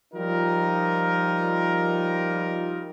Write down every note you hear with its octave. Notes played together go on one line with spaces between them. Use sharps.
F3 G3 D#4 F4 A#4